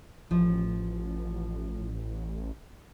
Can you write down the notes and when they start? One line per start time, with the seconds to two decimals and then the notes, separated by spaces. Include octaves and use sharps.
0.31 A1 F3